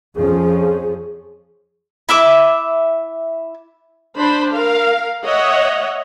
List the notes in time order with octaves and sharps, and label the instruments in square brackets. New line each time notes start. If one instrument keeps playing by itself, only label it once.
[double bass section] F2 F3 C#4 [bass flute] G#4
[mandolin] E4 E5 D6
[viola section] D4 C5 B5
A#4 F5
C#5 D#5 E5 F#5